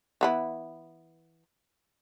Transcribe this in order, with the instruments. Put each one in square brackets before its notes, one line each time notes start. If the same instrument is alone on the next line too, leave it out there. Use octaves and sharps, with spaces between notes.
[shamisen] E3 B3 E4